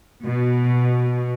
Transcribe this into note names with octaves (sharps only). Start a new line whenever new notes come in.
B2